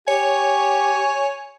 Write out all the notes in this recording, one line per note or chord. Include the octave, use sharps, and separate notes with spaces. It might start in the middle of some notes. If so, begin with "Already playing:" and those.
G4 C#5 G#5